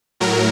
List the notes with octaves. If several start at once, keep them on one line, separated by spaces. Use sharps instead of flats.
A2 F#3 A#4